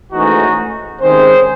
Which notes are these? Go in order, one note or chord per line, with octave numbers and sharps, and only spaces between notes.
G#2 E3 A3 C#4 D#4 F#4
C3 D#3 G#3 C#4 G#4 C5